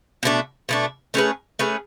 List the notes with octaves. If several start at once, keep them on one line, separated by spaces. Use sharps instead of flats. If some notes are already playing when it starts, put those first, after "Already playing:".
B2 A3 D4
B2 A3 D4
A3 C#4 G#4 B4
A3 C#4 G#4 B4